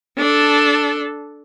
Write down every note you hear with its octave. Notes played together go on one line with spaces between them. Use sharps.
D4 A4